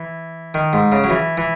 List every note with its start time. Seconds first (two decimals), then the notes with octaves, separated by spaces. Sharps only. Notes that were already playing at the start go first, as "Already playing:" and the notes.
Already playing: E3
0.54 D#3
0.73 G#2
0.92 C#3
1.04 F#3
1.10 E3
1.38 E3